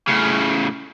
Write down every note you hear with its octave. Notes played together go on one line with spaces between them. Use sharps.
A2 C#3